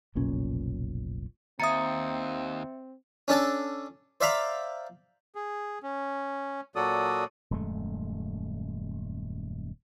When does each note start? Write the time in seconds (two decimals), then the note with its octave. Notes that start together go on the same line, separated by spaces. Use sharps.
0.15 F1 B1 A#2 C#4
1.60 D#2 C4 E5 A#5 D#6 A6 C#7
3.28 C#4 D4 A4 A5
4.21 C5 D5 E5 F5 A#5 B5
5.35 G#4
5.83 C#4
6.76 A#2 F#3 F#4 A4 D5 D#6
7.51 D#1 F#2 G#3 A3